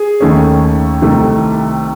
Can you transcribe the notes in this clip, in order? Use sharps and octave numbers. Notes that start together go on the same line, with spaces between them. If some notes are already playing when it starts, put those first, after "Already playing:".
Already playing: G#4
D#2 D#3 A3 C#4
C2 C3 D#3 A3